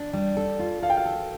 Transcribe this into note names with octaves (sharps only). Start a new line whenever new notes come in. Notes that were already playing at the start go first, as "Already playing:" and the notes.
Already playing: D4
G3
A4
F4
A4 F5
G5
F5
A4